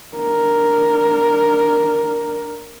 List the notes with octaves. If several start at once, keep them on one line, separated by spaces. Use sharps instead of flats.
D4 A#4